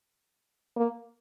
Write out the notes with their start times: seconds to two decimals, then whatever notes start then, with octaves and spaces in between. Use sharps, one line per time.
0.76 A#3